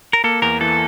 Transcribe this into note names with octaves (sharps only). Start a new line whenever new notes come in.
A#4
A#3 A4
E2 A#4
E3 A4